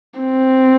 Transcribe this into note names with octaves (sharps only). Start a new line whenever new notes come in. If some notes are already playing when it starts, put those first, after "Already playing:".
C4